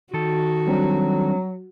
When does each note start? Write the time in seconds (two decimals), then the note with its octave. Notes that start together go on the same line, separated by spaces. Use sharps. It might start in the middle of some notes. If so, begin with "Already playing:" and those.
0.14 D#3 F#4 A4
0.67 F#3 G3 C4 D4